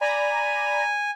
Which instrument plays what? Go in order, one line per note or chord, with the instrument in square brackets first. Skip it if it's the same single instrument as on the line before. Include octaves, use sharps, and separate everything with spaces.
[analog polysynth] D5 A#5 B5 [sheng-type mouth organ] G#5